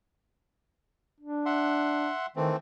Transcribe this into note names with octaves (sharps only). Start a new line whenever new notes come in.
D4
E5 F#5 C6
D#3 E3 A3 C4